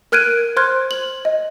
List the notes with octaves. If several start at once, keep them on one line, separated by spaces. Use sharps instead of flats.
A#4 F6 F#6 G#6 D7 D#7
C5 C6 F6 F#6 G#6
F#7
D#5